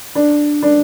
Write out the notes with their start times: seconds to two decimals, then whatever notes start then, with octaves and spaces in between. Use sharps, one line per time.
0.15 D4
0.62 D4